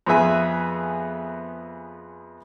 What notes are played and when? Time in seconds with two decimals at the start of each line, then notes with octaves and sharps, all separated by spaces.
0.07 F2 B3 G#4 E5 G#5